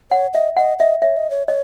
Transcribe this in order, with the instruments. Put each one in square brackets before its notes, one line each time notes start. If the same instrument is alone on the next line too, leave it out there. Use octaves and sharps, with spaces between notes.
[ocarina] C#5 [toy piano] F#5
[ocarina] D#5 [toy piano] E5
[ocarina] D#5 [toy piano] F#5
[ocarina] D#5 [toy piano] E5
[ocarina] C#5 [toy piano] E5
[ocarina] D#5
C#5
[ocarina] C#5 [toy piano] D#5